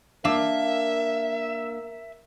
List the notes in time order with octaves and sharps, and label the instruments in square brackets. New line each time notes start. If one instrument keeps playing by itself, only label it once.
[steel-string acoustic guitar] A#3 [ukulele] D4 F5 [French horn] A#4 [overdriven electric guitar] E5